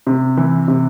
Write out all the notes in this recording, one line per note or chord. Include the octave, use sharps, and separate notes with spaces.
C3
E3
C3